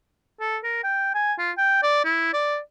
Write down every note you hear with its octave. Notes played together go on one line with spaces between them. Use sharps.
A4
A#4
G5
G#5
F4
G5
D5
E4
D5